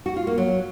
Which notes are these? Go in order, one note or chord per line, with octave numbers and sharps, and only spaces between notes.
F#4
F4
A#3
F#3